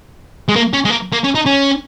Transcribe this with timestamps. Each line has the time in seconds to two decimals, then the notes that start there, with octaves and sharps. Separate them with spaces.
0.49 G#3
0.56 A#3
0.73 C#4
0.85 G#3
0.90 A#3
1.12 A#3
1.24 C#4
1.35 D#4
1.46 C#4